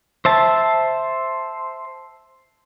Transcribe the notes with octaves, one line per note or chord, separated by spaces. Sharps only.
C5 E5 A5